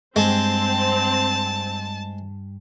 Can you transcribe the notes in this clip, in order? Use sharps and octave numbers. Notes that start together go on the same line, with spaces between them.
G2 G#3 C4 A5